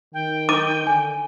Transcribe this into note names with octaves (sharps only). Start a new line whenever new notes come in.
D#3 G5
D6 D#7
D3 G#5